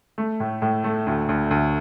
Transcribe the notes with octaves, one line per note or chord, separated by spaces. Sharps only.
A3
A2
A2
A3
D2
D2
D2